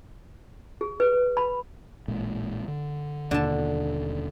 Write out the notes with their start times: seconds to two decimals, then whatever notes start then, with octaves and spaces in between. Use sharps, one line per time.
0.81 G#4
1.00 B4
1.37 B5
2.08 A1 A#2 G#3
2.68 D3
3.31 D#2 B2 D3 A#3 A5